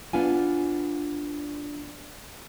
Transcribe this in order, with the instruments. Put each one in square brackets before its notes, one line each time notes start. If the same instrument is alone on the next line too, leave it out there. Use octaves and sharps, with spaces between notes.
[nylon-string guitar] B3 D4 F4 G#5